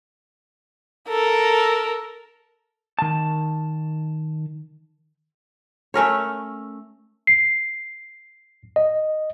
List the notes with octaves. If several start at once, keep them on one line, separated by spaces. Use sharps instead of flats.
A4 A#4
D#3 A5
A3 C#4 A#4 C#5
C7
D#5